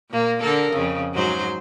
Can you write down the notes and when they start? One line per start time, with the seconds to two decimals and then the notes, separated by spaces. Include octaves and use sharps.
0.10 A#2 A#3
0.42 D3 A4 A#4
0.72 F2 C#3
1.13 G#2 F#3 C5